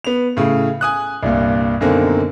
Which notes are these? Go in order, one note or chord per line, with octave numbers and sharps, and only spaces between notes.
B3 F7
A2 C#3
G#5 D#6 F#6
C2 G2 A#2
F#2 B2 D3 D#3 A#3 C4